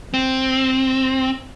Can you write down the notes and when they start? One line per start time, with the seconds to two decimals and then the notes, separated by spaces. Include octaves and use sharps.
0.14 C4